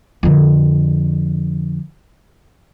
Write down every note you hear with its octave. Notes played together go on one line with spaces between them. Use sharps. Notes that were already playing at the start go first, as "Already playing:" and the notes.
F2 D3